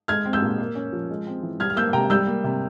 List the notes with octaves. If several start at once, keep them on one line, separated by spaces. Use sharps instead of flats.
G#3 F6 G#6
C4
E6 G6
A#2
A#3
C#4
F3
G#3
C4
E3
G3 F6 G#6
F6
A#3 E6 G6
C3 G5 A#5
G3 E6 G6
A#3
C3